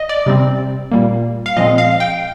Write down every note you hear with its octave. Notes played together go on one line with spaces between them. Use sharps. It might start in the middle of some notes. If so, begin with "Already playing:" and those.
Already playing: D#5
D5
C3 G3 C4
A#2 G3 A#3
F5
A#2 F3 G#3 C4 D#5
F5
G5